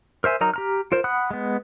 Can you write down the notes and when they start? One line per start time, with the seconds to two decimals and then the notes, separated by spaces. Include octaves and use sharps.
0.24 A#4 C5 E5 G#5
0.41 F#3 D#4 A#4 A#5
0.54 G4 A#5 F6
0.92 F4 A#4 C5
1.04 F#5 B5 D#6 F#6
1.31 G#3 B3